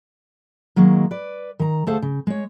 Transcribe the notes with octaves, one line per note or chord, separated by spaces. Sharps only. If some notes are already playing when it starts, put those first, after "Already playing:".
D#3 F#3 G#3 A#3
B4 D5
D#3 A#5
D2 A3 G#4 A4 C5 F5
C#3
G#3 C#5